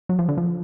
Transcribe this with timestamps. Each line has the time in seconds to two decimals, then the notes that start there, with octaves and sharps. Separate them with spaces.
0.09 F#3
0.19 F3
0.29 D3
0.37 F3